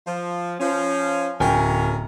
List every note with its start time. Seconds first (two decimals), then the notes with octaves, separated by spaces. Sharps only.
0.06 F3
0.60 F3 C#4
1.40 D1 C#4 A#4 G5 G#5